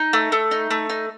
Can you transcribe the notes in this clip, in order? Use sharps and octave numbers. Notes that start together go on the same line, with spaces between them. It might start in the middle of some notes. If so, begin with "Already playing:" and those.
Already playing: D#4
A3
A3
D#4
A3
D#4